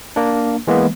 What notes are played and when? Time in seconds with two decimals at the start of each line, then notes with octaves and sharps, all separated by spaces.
0.16 A#3 D4
0.67 E3 G#3 A#3 B3